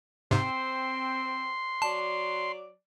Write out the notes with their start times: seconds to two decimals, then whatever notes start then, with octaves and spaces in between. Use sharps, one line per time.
0.31 G#2 C3 C4 C6
1.82 F#3 D5 A5